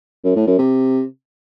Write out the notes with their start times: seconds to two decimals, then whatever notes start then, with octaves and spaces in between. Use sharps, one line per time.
0.24 F#2
0.35 A2
0.47 F#2
0.58 C3